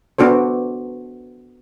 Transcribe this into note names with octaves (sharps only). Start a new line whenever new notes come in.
B3 D4 F#4 A4 C5